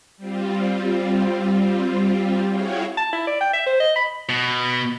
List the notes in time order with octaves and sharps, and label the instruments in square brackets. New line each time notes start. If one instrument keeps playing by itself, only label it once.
[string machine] G3 C4 F4
E4 F#4 G#4 C#5 F5 G5
[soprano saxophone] A5
E4
D5
G5
E5
C5
D#5
B5
[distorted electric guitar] B2